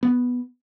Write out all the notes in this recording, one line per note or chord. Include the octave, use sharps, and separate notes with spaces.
B3